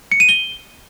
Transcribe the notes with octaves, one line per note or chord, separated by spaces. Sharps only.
C#7
D#7
G7